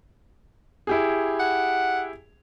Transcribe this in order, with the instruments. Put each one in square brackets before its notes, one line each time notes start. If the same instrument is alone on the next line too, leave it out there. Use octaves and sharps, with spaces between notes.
[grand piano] E4 G4 G#4
[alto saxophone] F#5